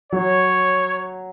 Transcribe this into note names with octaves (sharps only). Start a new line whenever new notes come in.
F#3 C#5